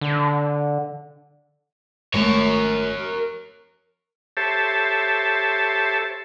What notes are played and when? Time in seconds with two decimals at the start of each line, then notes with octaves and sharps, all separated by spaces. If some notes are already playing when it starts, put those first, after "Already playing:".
0.01 D3
2.14 G#1 G#3 A3 A#4 C#5
4.37 G4 A4 C5 C#5 E5 A5